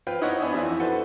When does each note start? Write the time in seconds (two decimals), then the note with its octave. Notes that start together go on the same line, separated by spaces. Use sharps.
0.07 C4 F4 B4 G5
0.21 D#4 E4 C5 C#5 D#5 F#5
0.40 B3 D4 E5 G#5 B5
0.53 F2 E3 E5
0.79 F#4 A4 B4 C5